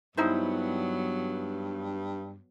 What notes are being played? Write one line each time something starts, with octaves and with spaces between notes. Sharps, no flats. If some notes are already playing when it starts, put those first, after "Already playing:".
G2 F#3 B3 D#4 E4 C5